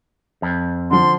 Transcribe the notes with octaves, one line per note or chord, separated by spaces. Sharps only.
F2
D3 F3 C6